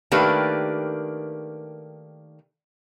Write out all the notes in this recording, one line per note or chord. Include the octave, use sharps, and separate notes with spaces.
D#3 A3 A#3 D4 G4 B4